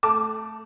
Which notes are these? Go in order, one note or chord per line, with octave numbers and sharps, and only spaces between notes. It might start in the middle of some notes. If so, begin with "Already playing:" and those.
A3 A5 D6